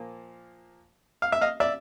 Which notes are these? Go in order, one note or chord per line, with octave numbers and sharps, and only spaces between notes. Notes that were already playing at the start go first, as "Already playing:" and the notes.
Already playing: A#2 F3 A#3
F5
E5
D#5 F5
D5 E5